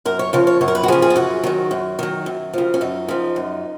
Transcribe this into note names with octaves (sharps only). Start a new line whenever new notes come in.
F#2 A#4
C#5
C#3 F3 C#5
C#5
F#2 C#5
A#4
B4
F#4
C#3 F3 G#4
G#4
F4
F#2 F#4
D#3 F#3
F#2
D#3 F#3
F#2
C#3 F3
C#4
F#2 D#4
C#3 F3
F#2